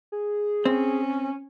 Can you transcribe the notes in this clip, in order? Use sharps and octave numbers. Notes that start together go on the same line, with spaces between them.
G#4
C4 C#4